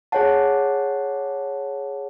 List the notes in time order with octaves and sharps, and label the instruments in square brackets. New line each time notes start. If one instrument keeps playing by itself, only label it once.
[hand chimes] G#4 C#5 F#5 A5